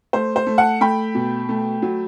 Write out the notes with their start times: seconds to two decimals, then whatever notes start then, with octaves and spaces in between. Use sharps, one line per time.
0.13 A3 C5
0.36 C5
0.47 A3
0.58 F#5 A5
0.81 A3 G5 B5
1.15 B2
1.49 A3
1.82 F#3